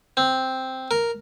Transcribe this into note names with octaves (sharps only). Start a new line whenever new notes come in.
C4
A#4